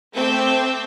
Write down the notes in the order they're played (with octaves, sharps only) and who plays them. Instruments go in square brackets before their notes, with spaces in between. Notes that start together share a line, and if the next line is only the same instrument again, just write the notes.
[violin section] A3 C4 D6 E6 G6